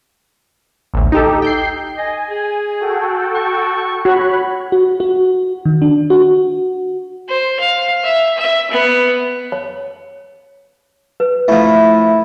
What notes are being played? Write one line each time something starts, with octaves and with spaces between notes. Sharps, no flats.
A1 D2
D#4 G4 A4
G5 G6 C7
D#5 G#5
G#4
F#4 A4 G5
C#6
F#4 C#5 B5 F#6
F#4
F#4
D#3
D4
F#4
C5
F5
E5
E5
B3
C#5
B4
F3 A3 E4